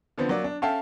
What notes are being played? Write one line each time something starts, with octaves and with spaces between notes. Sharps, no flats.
D3 F3 B3 C4
F#3 A#3 D5
D4
C#4 A4 E5 F5 G5 A5